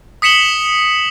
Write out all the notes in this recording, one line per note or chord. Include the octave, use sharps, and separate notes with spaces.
D#6 B6 C#7 E7 F#7 G7